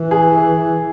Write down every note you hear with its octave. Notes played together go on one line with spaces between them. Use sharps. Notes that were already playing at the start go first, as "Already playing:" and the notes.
Already playing: E3
G#4